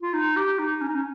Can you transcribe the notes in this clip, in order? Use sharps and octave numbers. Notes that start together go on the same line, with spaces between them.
F4
D#4
G4
D#4
C#4
D#4
C#4